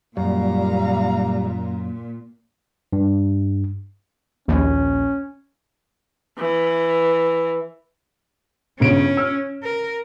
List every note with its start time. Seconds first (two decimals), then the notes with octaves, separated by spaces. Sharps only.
0.17 F#2 A#2 G3 F5 A#5
2.93 G2
4.48 A#1 D#2 C#4
6.39 E3
8.80 G1 C#3 C#4 D7
9.17 E6 F6
9.63 A#4